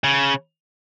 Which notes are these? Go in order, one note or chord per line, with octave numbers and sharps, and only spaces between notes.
C#3